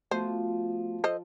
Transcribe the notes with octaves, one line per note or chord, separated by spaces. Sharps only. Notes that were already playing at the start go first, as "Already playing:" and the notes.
F3 A3 B3 F#4 C5
A4 C5 D#5